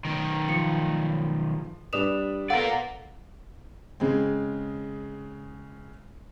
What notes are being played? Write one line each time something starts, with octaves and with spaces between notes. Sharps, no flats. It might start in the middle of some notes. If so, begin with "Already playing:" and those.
B1 D#3
F3 C#7
G3 D4 B4 D#6 E7 F7
B3 A4 A#4 D5 F5 F#5
C#3 G#3 C4